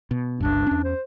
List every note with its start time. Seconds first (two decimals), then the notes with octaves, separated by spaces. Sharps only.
0.11 B2
0.41 G1 C#2 G2 D4
0.67 E2 C#4
0.84 C5